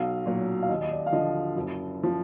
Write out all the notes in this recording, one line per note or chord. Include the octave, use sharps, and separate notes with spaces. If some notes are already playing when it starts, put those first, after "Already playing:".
Already playing: B1 F5
A#2 F#3
F5
D#2 D#5
D#5
D5
F5
D3 F3 D#5
F#1
F3